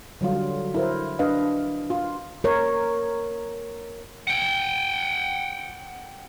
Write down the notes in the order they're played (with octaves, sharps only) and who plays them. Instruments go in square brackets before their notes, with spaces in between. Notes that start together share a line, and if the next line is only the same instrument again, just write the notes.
[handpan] D3 F#3 G3 F4
E4 A#4 C5
D4 B4 D#5 F5
F4
A#4 C#5
[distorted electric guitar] F#5 G5